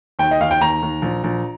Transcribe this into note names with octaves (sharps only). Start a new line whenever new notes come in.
D#2 G5
D#5
D#2 F5
G5
D#2 A#5
D#2
A#1
A#1